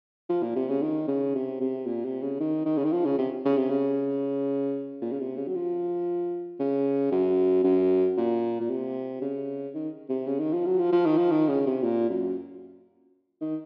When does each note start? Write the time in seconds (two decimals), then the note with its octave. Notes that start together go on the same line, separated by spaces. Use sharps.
0.29 F3
0.43 A#2
0.56 C3
0.69 C#3
0.82 D#3
1.08 C#3
1.35 C3
1.61 C3
1.87 A#2
2.05 C3
2.22 C#3
2.40 D#3
2.65 D#3
2.78 C#3
2.85 D#3
2.92 F3
3.05 C#3
3.18 C3
3.45 C#3
3.57 C3
3.70 C#3
5.02 A#2
5.12 C#3
5.20 C3
5.37 C#3
5.47 F#3
5.55 F3
6.59 C#3
7.12 F#2
7.64 F#2
8.17 A#2
8.61 A#2
8.70 C3
9.22 C#3
9.74 D#3
10.09 C3
10.27 C#3
10.39 D#3
10.53 F3
10.66 F#3
10.79 F3
10.92 F3
11.06 D#3
11.18 F3
11.31 D#3
11.49 C#3
11.66 C3
11.83 A#2
12.10 F#2
13.41 D#3